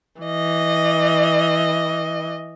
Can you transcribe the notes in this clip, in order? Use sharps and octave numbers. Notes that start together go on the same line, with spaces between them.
E3 D#5